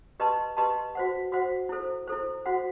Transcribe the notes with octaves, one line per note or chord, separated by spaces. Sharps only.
G4 B4 D#5 A5 C6
G4 B4 D#5 A5 C6
F#4 C5 F#5
F#4 C5 F#5
E4 A4 C5
E4 A4 C5
F#4 C5 F#5